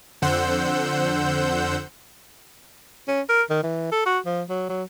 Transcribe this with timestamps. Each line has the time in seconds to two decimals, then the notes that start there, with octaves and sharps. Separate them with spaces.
0.22 F2 D3 C5 F#5 E6 G6
3.08 C#4
3.29 A#4
3.50 D#3
3.63 E3
3.92 A4
4.06 F#4
4.26 F3
4.49 F#3
4.69 F#3